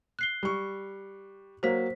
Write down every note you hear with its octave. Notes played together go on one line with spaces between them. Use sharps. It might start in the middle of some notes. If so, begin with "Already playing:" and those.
F#6 C7 G7
G3 C#6
F#3 A#3 C5 B6